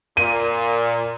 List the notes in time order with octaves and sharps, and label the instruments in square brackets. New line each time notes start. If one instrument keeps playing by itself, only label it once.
[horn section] A#2 [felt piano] D#7